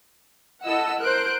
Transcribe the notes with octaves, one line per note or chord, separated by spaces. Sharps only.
E4 A4 D#5 F#5 E6
A#4 C5 F#6 D7